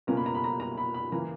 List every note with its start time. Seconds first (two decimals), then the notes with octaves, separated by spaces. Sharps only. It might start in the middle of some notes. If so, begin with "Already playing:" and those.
0.07 C#2 B2 A#3 C#4 A#5
0.17 B5
0.26 A#5
0.35 B5
0.44 A#5
0.60 A#5
0.77 B5
0.94 B5
1.12 C#3 E3 A#3 A#5